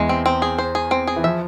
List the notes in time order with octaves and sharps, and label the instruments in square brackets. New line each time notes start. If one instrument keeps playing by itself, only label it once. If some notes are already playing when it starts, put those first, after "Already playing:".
Already playing: [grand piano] E2 E3 [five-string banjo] G#3
[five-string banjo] C4
C4
G#4
C5
G#4
C4
G#4
[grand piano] E3
[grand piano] F3 [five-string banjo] E5